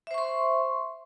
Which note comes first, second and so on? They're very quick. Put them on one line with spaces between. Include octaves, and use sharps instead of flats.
E5 C5 C#6 C6